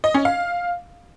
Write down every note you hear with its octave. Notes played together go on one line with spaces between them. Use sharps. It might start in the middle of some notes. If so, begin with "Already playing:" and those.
D#5
C#4
F5